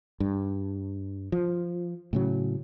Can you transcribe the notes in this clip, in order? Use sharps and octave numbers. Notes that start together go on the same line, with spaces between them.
G2
F3
A2 C#3 F#3